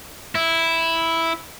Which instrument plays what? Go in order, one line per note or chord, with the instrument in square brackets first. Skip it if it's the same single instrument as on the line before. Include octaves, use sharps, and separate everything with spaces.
[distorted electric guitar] E4